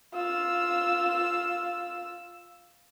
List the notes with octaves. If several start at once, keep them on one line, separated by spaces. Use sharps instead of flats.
F4 E6